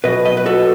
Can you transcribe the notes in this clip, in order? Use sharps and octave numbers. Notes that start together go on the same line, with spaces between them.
B2 F#3 B4 D#5
B4 D#5
B4
F#4 A4